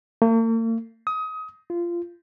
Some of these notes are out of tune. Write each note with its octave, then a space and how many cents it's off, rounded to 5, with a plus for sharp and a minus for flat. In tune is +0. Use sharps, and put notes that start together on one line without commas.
A#3 -45
D#6 +25
F4 -20